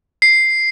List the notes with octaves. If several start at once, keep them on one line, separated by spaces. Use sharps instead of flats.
C7